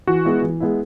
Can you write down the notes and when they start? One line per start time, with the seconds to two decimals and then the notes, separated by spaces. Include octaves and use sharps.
0.07 E3 F#4
0.25 G#3 B3 E4
0.42 E3
0.60 G#3 B3 E4